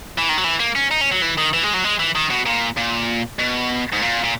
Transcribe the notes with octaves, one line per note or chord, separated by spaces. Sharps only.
E3
D#3
F#3
E3
A#3
C#4
D#4
C#4
F#3
E3
D#3
E3
G#3
F#3
G#3
E3
D#3
B2
A#2
A#2
B2
G#2
A#2
A#2